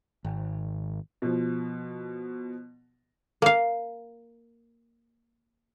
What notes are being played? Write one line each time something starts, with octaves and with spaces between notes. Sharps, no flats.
G#1
B2 F3
A#3 F5